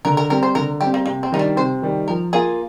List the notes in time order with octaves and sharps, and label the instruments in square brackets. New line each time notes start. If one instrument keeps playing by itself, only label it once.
[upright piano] D3 [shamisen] A#4
[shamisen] A#4
[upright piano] G3 C4 [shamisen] A#4
[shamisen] C5
[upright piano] D3 [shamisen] A#4
[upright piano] G3 C4 [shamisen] G4
[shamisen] A#3
[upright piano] C3 [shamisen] A#3
[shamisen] C4
[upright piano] D#3 G3 [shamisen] D#4
[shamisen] D4
[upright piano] C3 [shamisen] C5
[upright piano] D#3 G3
[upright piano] F3 [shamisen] A#4
[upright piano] A#3 F4 [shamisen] G#4